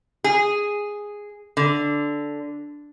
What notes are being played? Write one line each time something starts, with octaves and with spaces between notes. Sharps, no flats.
G#4
D3